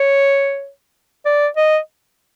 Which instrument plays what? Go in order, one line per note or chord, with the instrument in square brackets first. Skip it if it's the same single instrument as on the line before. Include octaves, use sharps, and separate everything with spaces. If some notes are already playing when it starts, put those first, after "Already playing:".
Already playing: [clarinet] C#5
D5
D#5